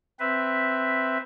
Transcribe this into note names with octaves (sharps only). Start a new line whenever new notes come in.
C4 B4 E5